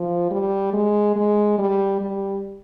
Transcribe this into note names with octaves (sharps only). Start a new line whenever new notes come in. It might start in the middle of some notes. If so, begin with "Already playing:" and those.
Already playing: F3
G3
G#3
G#3
G3
G3